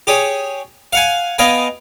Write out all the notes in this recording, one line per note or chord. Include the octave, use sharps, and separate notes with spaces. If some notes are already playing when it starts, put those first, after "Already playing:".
G4 G#4 C#5
F5 F#5 G#5
B3 D#5 F5 G5 G#5